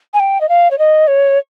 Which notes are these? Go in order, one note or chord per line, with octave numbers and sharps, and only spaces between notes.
G#5
G5
D#5
F5
C#5
D#5
C#5